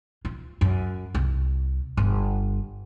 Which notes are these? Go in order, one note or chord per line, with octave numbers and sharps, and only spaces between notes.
F4
F#2
C2
G1